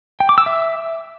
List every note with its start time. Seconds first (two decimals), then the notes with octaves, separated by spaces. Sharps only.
0.20 G5
0.29 D6
0.38 E6
0.46 E5